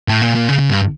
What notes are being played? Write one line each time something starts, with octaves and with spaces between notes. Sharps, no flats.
A2
A#2
A#2
C#3
C#3
G2